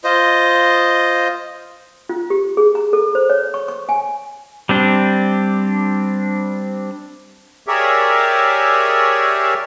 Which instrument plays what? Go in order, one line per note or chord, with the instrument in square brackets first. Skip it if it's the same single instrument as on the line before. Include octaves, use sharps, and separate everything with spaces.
[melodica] F4 C5 D#5
[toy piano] F4
G4
G#4
A#5
A4
C5
C#5
C#6
C#6
G#5
[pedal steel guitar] G3 C4 D4
[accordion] G4 G#4 A#4 C#5 D5 E5